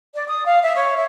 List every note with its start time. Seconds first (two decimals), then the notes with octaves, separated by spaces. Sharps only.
0.12 D5
0.27 D#6
0.44 F5
0.63 E5
0.74 C#5
0.95 E5